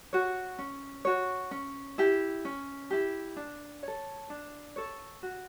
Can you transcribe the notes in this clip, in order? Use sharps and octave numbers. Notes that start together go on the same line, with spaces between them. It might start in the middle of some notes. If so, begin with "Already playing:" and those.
F#4 C#5
C#4
F#4 C#5
C#4
E4 G4
C#4
E4 G4
D4
A4 C#5
D4
A4 C#5
F#4